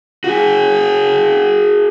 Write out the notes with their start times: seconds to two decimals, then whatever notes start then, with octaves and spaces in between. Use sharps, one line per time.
0.24 F#4 G#4